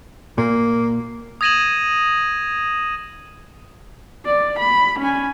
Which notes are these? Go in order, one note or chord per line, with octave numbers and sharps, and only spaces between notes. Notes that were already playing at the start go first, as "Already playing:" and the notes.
A#2 A#3
D#6 G#6 A#6 D#7 E7 F#7
D5
B5
C#4 G#5